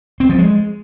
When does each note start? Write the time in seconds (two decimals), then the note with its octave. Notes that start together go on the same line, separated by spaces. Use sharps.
0.20 C4
0.29 F3
0.38 G#3